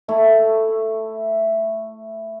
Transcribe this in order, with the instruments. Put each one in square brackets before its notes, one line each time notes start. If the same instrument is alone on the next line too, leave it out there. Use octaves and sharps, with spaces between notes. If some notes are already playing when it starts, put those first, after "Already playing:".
[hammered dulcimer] A3 E4